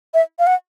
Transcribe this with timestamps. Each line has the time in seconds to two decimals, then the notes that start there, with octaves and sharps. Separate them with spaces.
0.14 E5
0.39 F5
0.47 F#5